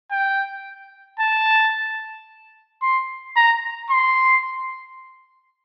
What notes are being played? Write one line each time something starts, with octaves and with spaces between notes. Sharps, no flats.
G5
A5
C6
A#5
C6